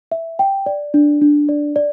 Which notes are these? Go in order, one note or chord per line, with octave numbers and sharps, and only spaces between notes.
E5
G5
D5
D4
D4
D5
D5